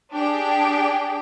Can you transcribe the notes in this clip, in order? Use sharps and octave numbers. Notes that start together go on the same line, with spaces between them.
D4 G4 G#4 G5